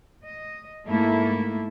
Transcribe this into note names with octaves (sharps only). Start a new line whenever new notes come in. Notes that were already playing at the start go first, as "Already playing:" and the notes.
D#5
G#2 A3 A#3 E4 A4